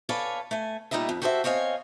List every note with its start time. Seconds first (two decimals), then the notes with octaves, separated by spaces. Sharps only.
0.09 A4 B4 C#5 D5 F5 G#5
0.51 A3 G#5
0.91 A#2 G3 D#4 D#5 E5
1.09 F2
1.22 F#4 G4 A4 C5 D5 E5
1.44 C4 C#5 D#5 F5 G#5